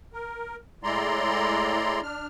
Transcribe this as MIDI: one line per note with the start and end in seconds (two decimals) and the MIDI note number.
0.13 0.56 70
0.83 2.01 45
0.83 2.01 56
0.83 2.01 64
0.83 2.01 74
0.83 2.01 82
0.83 2.01 84
2.03 2.28 62
2.03 2.28 89